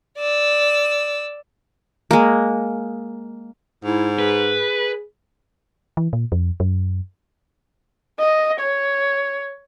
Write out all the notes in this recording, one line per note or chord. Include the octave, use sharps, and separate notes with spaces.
D5 E6
G#3 A#3
G#2 E4
G#4 B4
E3
A#2
F2
F#2
D#5
C#5